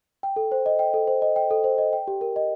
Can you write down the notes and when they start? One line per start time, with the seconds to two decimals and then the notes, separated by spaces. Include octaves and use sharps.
0.23 G5
0.36 A4
0.52 C5
0.66 D#5
0.79 G5
0.94 A4
1.07 C5
1.22 D#5
1.36 G5
1.51 A4
1.64 C5
1.78 D#5
1.93 G5
2.08 G4
2.21 A#4
2.36 D#5